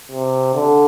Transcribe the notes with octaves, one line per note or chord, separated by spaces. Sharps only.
C3
D3